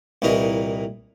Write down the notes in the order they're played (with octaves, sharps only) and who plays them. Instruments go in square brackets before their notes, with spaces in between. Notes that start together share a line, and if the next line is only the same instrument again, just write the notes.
[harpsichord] C2 A#2 E3 D#4 A#4